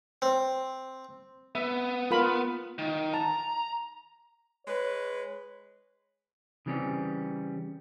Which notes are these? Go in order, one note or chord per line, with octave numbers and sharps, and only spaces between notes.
C4
B3 E5
F4 A#4 B5
D#3
A5 A#5
G#3 B4 C#5
C#3 E3 G3 C4 C#4